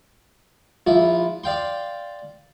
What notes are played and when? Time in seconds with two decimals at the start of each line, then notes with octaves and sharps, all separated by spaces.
0.87 A#1 E4 F4
1.44 D5 F5 G5 C6